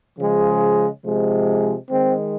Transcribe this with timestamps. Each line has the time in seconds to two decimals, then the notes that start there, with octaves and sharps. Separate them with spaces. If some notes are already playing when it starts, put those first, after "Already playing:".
0.17 C#3 F3 G#3
1.03 C3 F3 G#3
1.89 D#3 G#3 C4